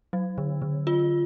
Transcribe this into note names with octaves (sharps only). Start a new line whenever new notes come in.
F#3
D3
D3
F4